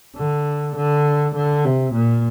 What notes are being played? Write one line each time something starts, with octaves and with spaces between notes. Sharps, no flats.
D3
D3
D3
C3
A#2